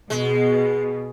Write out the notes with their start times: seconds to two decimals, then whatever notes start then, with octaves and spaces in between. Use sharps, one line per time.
0.10 B2 G#3